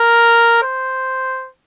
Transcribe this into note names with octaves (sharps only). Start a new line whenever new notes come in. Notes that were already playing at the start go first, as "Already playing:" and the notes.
Already playing: A#4
C5